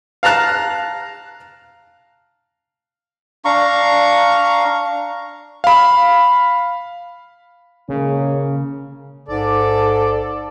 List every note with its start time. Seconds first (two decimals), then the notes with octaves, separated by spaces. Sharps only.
0.23 F5 A5 A#5 F#6
3.45 D4 F5 A#5 C#6
5.64 F5 B5
7.89 D#1 C#3 G#3 A#3 C#4
9.28 A1 G#2 A4 D5